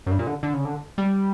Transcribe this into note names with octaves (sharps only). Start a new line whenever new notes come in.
F#2
G2
A#2
D3
D3
C#3
D3
G3